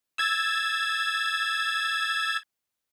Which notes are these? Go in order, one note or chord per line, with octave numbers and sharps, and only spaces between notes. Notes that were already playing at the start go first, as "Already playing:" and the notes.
E6 G#6 A6